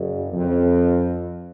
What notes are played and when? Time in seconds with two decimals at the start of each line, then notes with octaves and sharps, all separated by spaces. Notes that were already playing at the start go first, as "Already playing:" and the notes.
Already playing: F#1 F#2
0.32 F2